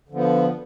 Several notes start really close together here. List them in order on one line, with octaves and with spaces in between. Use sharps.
D3 F3 B3